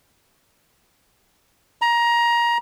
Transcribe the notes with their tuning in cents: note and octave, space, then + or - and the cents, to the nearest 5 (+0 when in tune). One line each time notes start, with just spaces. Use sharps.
A#5 +20